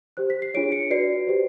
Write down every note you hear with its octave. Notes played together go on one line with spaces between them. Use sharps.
G4 C5 F#6
B6
C7
D4 F4 G#4 C#5 D7
C#7
F#4 B4 D5 C7
G4 C5